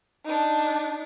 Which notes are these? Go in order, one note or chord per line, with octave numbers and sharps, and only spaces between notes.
D4 D#4